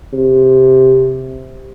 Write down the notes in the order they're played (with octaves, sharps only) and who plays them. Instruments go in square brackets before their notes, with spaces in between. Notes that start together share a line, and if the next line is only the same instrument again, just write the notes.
[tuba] C3